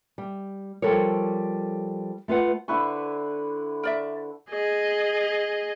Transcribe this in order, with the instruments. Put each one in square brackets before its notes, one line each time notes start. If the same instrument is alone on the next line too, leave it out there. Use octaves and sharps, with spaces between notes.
[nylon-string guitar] G3
F3 G3 A4 A#4 C#5
A3 F4 B4 F#5
[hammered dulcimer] D3 C5 [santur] E4 B4 C#6
[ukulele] A#4 D5 E5
[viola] G#4 D#5